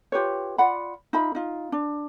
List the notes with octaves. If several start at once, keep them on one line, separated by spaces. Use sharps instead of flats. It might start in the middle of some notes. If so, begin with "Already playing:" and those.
F4 G4 B4 C#5
F4 D5 F#5 B5
D#4 F4 E5 B5
D#4 F4
D4